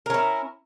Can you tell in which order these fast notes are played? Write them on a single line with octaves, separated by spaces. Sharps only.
A#4 C#4 E4